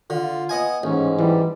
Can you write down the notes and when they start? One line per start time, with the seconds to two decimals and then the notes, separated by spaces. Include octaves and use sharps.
0.10 D3 F4
0.49 B3 D#5 G#5
0.83 A1 G#2 C#4
1.19 E3 G3